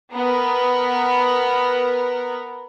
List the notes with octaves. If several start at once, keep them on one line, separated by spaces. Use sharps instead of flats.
B3 A#4